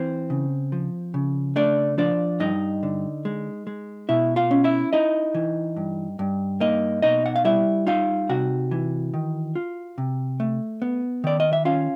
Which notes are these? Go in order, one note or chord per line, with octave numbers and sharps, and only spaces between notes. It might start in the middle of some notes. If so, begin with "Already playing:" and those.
Already playing: E3 C4 C5
C#3
F3
C#3
A3 D4 D5
F3 D4 D5
G2 D#4 D#5
D3
G#3
G#3
B2 E4 E5
F4 F5
C#4
E4 E5
D#4 E4 D#5
E3
G2
G2
A#3 D#4 D#5
B2 D#4 D#5
F#5
F5
G3 E4 E5
D#4 F4 F5
C3 F#4 F#5
E3
D#3
F4
C3
A3
B3
D#3 D5
D#5
E5
C#4 F4 F5